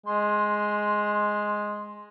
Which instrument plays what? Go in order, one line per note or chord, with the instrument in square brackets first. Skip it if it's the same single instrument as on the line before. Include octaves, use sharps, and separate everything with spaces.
[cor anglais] G#3 [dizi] C6